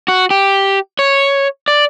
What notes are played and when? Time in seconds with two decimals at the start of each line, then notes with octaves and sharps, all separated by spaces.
0.08 F#4
0.30 G4
0.99 C#5
1.68 D5